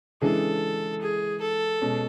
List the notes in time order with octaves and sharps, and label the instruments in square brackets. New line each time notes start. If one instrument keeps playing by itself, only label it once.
[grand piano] C#3 E3 G#3 D4 G#4 [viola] A4
[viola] G#4
A4
[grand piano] B2 G#3 C#4